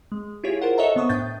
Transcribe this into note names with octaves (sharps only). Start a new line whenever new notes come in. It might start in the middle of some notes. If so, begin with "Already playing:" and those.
G#3
E4 F4 G4 G#4 C#5
F4 A#4 C5 F#5
A4 C#5 D#5 E5 F#5 A#5
D3 B3 C5 C#6 D#6
A2 D4 G5 D#6 G6 A6